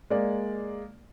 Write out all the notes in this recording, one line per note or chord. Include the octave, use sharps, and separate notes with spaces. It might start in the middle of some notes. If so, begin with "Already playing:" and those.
G#3 A#3 D5